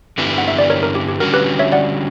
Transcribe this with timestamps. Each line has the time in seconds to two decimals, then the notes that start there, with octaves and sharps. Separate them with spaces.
0.18 G2 D3 G3 B3 E4
0.38 F#5
0.48 E5
0.59 D5
0.70 A#4 C#5
0.83 A#4
0.95 G4
1.08 G4
1.20 D3 G3 C#4 F#4 A#4
1.33 G4 B4
1.59 C#5 E5
1.72 D5 F#5